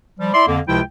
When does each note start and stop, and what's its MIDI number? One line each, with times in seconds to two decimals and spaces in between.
0.20 0.31 53
0.20 0.31 55
0.34 0.47 64
0.34 0.47 74
0.34 0.47 76
0.34 0.47 84
0.47 0.60 41
0.47 0.60 50
0.47 0.60 58
0.68 0.81 37
0.68 0.81 48
0.68 0.81 53
0.68 0.81 64
0.68 0.81 79